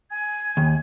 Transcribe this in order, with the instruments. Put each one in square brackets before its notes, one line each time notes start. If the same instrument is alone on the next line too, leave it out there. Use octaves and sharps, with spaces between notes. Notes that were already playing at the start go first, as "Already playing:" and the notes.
[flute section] G#5 G#6
[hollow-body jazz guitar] D#2